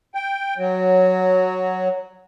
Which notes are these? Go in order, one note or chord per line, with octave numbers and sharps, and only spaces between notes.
G5
F#3